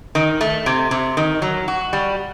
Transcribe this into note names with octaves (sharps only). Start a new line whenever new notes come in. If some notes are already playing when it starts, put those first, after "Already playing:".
D#3
A3
C3
C3
D#3
F#3
F#4
G3